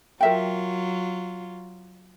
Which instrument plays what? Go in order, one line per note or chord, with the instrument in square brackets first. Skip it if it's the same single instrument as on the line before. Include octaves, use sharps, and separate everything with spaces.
[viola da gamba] F#3 F4 [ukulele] A#4 E5 G5